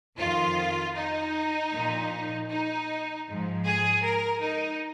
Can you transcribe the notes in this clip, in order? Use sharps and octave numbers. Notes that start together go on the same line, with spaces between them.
F2 D#3 F4
D#4
A#2 F3
D#4
G#2 F3
G#4
A#4
D#4